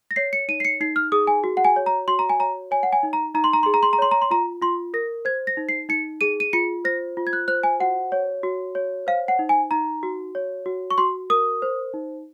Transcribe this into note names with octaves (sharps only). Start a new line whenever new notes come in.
A#6
C#5 C7
C#7
D#4 D#7
C7
C#7
D#4 C7
F6
G#4 D#6
G#5
F#4
F#5
G#5
C#5
A#5
F#4 C6
A#5
G#5
C#5 A#5
C#5 G#5
F#5
G#5
D#4
A#5
D#4 A#5
C6
A#5
G#4 C6
A#5
C6
A#5
C#5 C6
A#5
C6
F4 A#5
F4 C6
A#4 A#6
C5 G#6
A#6
D#4
C7
D#4 C#7
G#4 D#7
D#7
F4 C#7
C5 A#6
F4
G#6
F#6
C5 F#6
G#5
F#4 F#5
C#5
F#4
C#5
C5 F5
F#5
D#4
G#5
D#4 A#5
F#4
C#5
F#4
C#6
F#4 C6
A#4 D#6
C5
D#4